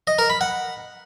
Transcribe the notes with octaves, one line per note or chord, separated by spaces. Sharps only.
D#5
A#4
B5
F#5